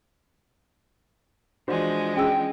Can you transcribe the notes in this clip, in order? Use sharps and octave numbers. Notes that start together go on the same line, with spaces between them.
E3 F3 G#3 D4 F#4 C5
C#4 G#4 G5 E6